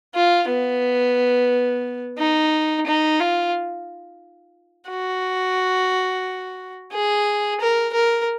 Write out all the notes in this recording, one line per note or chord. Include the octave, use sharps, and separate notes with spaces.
F4
B3
D#4
D#4
F4
F#4
G#4
A#4
A#4